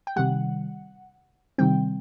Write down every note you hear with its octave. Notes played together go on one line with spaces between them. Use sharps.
G5
C3 D#3 G3 F#5
C3 D#3 G3 C4 G5